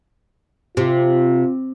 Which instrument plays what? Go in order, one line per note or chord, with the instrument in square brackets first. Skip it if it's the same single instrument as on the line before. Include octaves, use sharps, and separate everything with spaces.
[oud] C3 [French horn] F4